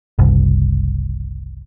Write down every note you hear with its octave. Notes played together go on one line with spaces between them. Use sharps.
F#1 C2